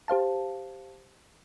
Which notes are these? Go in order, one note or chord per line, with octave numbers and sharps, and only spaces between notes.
G4 C5 F5 A5